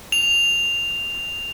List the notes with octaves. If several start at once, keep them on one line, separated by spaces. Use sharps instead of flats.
F7